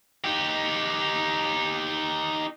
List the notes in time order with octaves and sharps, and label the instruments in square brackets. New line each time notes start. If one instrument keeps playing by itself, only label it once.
[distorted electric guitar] D#4 G4